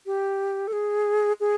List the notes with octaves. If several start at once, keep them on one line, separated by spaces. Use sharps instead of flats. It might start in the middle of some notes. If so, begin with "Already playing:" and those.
G4
A4
G#4
G#4